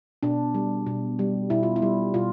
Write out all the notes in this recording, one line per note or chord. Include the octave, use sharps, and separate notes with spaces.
B2 D4
G3
B2
G3
B2 E4
F4
E4
G3
B2 F4